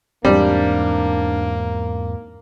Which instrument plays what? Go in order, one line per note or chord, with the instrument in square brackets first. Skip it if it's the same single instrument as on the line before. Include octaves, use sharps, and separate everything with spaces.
[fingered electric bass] E2 G#2 C4 [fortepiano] G3 [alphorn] A#3 [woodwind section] D4